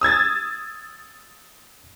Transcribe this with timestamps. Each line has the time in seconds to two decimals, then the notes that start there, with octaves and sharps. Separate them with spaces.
0.01 D#6 E6 G#6 A6